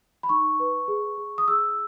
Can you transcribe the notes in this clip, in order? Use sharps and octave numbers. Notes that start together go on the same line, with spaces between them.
B5
D#4 C#6
B4
G#4
G#4
D#6
G#4 E6